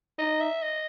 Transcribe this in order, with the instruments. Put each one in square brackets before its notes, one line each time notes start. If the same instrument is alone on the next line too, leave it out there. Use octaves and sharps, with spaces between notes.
[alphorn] D#4 [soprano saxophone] D#5
[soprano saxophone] E5
D#5